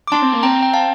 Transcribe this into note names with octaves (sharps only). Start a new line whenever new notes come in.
D6
D4 A5 C6
C4
A#3
C4 G5 A#5
G5
F5 A5